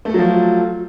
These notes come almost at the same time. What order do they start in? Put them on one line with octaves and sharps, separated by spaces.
A3 A4 F#3 F3